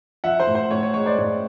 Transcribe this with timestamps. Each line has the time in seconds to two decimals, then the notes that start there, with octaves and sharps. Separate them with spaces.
0.24 F3 E5 F#5
0.40 C5
0.47 A2
0.55 C5
0.71 A2 C#5
0.83 C#5
0.94 G#3 C#5
1.06 C5 D5
1.18 A2 C#5